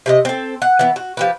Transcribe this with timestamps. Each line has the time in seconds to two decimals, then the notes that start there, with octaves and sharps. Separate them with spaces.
0.06 C3 B4 D#5
0.25 C4 A4
0.62 F#5
0.79 E3 B3
0.96 F#4
1.17 F3 G4 B4